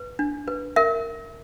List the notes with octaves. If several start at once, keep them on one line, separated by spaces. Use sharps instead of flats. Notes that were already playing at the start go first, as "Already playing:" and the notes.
Already playing: B4
D4
B4
A#4 E5